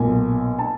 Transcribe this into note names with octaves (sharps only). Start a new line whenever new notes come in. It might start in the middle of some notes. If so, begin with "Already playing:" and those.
Already playing: B1 A#2 G#5
A5